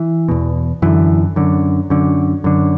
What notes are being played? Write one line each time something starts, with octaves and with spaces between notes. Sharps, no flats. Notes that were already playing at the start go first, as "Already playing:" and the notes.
Already playing: E3
E2 B2
F#2 D3 E3
F#2 D3
F#2 D3
F#2 D3